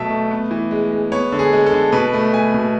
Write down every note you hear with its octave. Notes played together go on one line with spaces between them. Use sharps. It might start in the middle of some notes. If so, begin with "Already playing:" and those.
Already playing: B2 F#3 A3 E5 A5
A3
B3
E3
G#3
G#3
B3 C#5
D3
G#4
G#3
A4
D3
B2 B4
A3
A3 G#5
B2